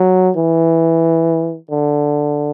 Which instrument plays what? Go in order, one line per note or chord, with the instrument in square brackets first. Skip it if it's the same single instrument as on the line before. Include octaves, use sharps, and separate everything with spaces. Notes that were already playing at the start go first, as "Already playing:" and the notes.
Already playing: [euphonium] F#3
E3
D3